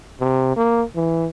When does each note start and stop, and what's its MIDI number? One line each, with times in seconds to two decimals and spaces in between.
0.20 0.54 48
0.56 0.83 58
0.96 1.27 52